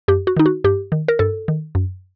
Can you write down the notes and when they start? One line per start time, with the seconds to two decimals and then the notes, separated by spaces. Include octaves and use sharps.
0.08 F#2 G4
0.27 F#4
0.37 D#3 D#4
0.46 F#4
0.64 G2 G4
0.92 D#3
1.08 A#4
1.19 G2 A4
1.48 D#3
1.75 F#2